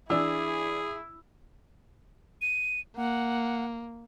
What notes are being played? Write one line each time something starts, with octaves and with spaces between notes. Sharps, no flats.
E3 D4 E4 G#4 E6
D#7
A#3 F#5